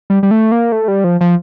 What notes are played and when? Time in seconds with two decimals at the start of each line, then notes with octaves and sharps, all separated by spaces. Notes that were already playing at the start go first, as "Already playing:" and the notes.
0.10 G3
0.23 G3
0.31 A3
0.52 A#3
0.72 A3
0.88 G3
1.04 F3
1.21 F3